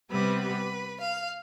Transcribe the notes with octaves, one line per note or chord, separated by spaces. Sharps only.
C3 G3 B3 B4
B4
F5